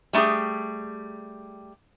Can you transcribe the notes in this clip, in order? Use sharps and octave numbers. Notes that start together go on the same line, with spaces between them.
G3 A3 D#4 G4 G#4